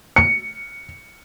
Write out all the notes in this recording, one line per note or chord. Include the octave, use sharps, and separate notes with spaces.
C#7